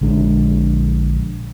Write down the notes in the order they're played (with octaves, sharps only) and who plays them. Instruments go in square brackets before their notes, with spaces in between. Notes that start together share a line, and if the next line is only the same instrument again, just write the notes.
[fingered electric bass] A#1 D3 G#3 D4